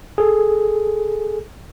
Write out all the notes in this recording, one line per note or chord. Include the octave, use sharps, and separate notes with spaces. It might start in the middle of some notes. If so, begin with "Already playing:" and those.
G#4 A4